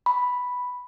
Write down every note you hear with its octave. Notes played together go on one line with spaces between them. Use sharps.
B5